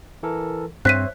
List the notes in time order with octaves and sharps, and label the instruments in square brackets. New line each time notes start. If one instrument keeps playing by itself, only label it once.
[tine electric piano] E3 A4 A#4
[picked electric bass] G2 C4 [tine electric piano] C5 C#5 E5 [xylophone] F#6 B6 D#7